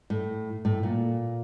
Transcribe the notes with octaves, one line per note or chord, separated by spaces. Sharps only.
A2
A2
A#2